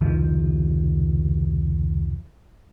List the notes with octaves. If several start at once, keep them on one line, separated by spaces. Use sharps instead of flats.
F1 C#2 D#3 F3